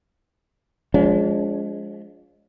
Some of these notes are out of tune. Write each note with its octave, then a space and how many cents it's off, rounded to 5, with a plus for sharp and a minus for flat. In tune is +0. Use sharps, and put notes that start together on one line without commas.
F3 +20 G#3 +0 D4 -45